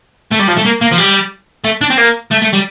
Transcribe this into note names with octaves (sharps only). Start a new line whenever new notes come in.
A3
G3
F3
A3
A#3
A#3
F3
G3
A3
D4
C4
A#3
A3
A3
G3